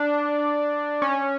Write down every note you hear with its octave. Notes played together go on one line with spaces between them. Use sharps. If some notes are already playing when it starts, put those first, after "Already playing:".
Already playing: D4
C#4